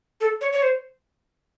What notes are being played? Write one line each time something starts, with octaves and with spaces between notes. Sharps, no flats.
A4
C#5
C#5
C5